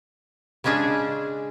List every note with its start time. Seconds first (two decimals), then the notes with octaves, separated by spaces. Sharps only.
0.64 C#3 G#3 C#4 D4 G#4